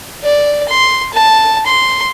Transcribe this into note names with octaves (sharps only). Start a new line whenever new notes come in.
D5
C6
A5
C6